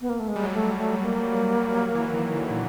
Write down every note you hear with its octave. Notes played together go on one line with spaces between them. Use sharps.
B3
A#3
A3
G#3
G3
F#3
G3 A3
A3
A#3
F#3
E3
D#3
D3
A#2